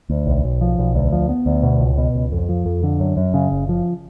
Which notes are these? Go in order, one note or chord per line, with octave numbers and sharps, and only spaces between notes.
D2
B1
B1
F3
B1
D2
F3
B3
D2
B2
C#2
B2
C#2
F2
F3
F2
D3
F#2
F#2
C#3
F#1
F3